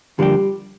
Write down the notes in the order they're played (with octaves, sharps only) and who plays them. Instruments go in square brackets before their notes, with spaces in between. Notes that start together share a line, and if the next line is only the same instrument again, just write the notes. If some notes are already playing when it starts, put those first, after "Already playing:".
[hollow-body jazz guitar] D3 F3 A#3 D4 G4 [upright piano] G3